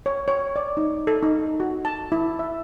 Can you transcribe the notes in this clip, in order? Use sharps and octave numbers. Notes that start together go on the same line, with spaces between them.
C#5
C#5
D5
D#4
A4
D#4
F#4
A5
E4
E5